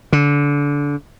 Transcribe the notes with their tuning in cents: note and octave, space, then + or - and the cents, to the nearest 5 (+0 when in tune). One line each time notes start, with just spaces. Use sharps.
D3 -25